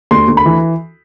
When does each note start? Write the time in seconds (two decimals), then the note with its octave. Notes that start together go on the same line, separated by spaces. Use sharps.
0.11 D2 C6
0.28 D2
0.37 B5
0.45 E3